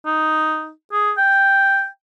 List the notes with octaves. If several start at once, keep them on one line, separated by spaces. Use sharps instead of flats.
D#4
G#4
G5